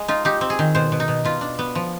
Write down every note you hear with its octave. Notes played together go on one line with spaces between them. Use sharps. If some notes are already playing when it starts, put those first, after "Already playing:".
Already playing: G#3
D#4 F4
D#4 G4
C4
G#4
D#3
B2 C5
B2
D#4
B2
B2 F4
D4
B3
F3